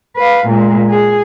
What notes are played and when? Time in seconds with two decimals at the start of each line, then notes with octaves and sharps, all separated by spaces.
0.16 B4 F5
0.47 A#2 G#3
0.90 G#4